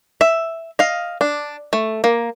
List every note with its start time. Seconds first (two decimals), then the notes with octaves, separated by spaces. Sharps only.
0.21 E5
0.79 D#5 F5
1.21 D4
1.73 A3
2.04 A#3